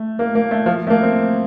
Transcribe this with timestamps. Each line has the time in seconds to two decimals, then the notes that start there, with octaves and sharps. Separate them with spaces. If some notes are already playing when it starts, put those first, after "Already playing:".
Already playing: A3
0.19 A#3
0.35 A#3
0.51 A3
0.66 F3
0.87 A3
0.90 A#3
1.03 C4